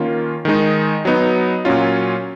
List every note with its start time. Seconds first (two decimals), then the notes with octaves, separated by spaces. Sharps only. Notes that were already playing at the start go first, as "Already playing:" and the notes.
Already playing: D#3 A#3 C#4 F4
0.45 D#3 G#3 D#4
1.05 F#3 B3 D#4
1.65 A#2 F#3 C#4 F4